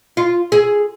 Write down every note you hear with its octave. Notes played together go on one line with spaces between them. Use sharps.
F4
G#4